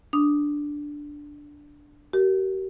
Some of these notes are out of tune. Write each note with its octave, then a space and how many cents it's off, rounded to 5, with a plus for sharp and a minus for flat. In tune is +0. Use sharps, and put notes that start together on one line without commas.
D4 +0 D#6 +0
G4 -45 A#4 +0